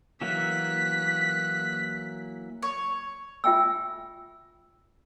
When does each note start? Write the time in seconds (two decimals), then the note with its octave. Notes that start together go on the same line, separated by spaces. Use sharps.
0.22 E3 F#3 A#3 F#6 B6
2.63 C#5
3.44 F4 E5 G5 G#5 E6